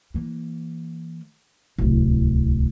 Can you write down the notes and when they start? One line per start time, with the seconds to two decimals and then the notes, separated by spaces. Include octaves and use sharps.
0.14 E3 A#3
1.78 D1 C2